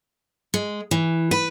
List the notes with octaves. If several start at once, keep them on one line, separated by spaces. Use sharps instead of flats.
G#3
E3
B4